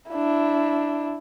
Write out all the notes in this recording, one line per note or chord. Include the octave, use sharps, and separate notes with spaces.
D4 E4